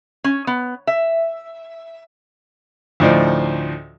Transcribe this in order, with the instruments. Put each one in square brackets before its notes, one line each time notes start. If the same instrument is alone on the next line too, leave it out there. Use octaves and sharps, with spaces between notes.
[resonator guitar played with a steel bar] C#4
B3
E5
[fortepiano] D2 A2 F3 D#4 C5 D5